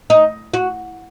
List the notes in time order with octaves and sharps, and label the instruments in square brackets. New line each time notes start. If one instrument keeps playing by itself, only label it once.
[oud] D#4
F#4